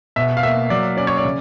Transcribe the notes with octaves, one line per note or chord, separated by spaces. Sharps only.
B2 E5
F5
A#3 E5
F#3 D5
C#4 D5
C#5
D5
C#3